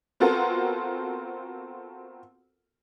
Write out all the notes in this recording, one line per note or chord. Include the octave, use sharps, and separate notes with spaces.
B3 C4 F4 F#4 A4 A#4